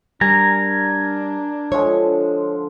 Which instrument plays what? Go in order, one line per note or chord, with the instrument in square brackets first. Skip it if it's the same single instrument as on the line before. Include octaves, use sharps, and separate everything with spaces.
[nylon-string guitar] G3 [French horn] D4 [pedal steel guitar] A#4 G#5 A#5
[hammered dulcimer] D3 F3 G#3 [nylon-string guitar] C#5